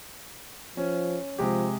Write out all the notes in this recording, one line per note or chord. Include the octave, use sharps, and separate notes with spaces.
F3 C#4
C3 F3 G#3 G4